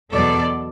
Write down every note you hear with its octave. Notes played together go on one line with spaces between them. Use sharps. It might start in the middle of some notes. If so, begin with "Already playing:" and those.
E2 B2 F#3 A4 D5